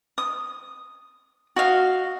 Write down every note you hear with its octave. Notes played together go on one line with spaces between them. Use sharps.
D#6
F#4 D#5 F5